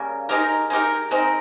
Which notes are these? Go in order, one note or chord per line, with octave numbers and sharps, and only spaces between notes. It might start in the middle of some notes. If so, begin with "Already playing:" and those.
Already playing: C#3 G3 A#3
G#3 D#4 G4 A#4
G#3 D#4 G4 A#4
G#3 C4 D#4 A#4